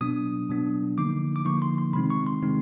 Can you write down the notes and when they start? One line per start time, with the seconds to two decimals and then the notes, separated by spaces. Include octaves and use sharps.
0.01 B2 F#3 B3 D4 D#6
0.49 B2 F#3 B3 D4
0.98 D3 F3 A#3 D#4 D6
1.36 D6
1.45 D3 F3 A#3 D#4 C#6
1.62 C6
1.78 C6
1.93 C3 D#3 G#3 C4 D#4 B5
2.10 C#6
2.26 C6
2.42 C3 D#3 G#3 C4 D#4